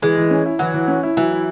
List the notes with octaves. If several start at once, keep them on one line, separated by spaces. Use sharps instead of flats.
E3 G#3
E3
C#4
E4
E3 F#3
E3
C#4
E4
E3 F#3
E4